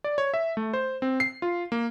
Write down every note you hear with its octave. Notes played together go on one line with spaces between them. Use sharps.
D5
C#5
E5
A3
C5
C4
C7
F4
A#3